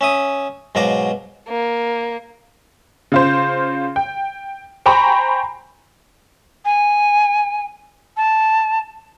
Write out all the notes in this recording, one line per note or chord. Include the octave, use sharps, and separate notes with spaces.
C#4 E5 D#6
G#2 B2 F#3 F5 A#5 D6
A#3
C#3 F4 C5
G5
C5 G5 G#5 A#5 B5 C#6
G#5
A5